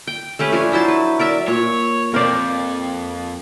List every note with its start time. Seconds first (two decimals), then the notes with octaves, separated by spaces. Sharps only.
0.07 G5
0.39 A3 C#4 G4 B4
0.52 F3 D4 G#5
0.72 F#3 E4 C5 A5
0.88 B4
1.19 A#4 D5 E5
1.48 A#2 C#5
2.14 F2 A#4 C5 D5